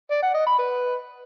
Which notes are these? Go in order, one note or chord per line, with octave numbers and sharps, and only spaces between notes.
D5
F#5
D#5
B5
B4